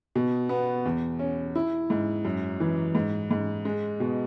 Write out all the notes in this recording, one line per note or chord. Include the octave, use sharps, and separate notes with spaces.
B2
B3
E2
C#4
E4
G#2
F#2
E3
G#2
G#2
G#3
B2